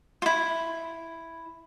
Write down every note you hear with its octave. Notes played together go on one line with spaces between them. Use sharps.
E4 F4